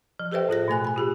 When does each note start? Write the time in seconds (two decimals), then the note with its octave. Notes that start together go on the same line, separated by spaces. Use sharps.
0.20 F3
0.32 G4 A4 B4 C5 E5 G5
0.48 A2 F4 G#4 A#6
0.68 B2 A3 G#5 F#6
0.84 G#5 B5
0.96 F4 G4 G#4